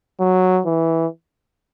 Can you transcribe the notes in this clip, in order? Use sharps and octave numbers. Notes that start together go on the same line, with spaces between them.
F#3
E3